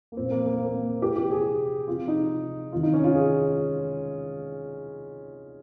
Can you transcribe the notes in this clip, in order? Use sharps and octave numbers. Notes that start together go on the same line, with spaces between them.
A#3
A#2 F3 C4
A#3
A#3
C4
A#3
C3 F3 G4
G4
G#4
C3 F3 F4
D#4
C3 D#3 F4
D#4
C#4
F4
G#4